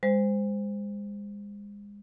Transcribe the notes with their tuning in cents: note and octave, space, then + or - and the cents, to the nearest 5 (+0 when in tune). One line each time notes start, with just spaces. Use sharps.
G#3 -35 C5 -15